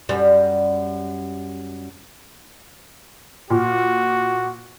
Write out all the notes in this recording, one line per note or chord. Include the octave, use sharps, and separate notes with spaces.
F#2 G3
A#2 F#4